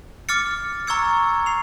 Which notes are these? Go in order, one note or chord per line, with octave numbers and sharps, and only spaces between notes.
D6 F6 A6 C#7
A#5 C#6 E6 G#6 C#7
C7 F7